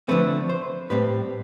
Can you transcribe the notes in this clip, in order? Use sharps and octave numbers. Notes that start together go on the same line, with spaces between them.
D3 F3 A3 C4 B4
C5
A2 G3 C4 B4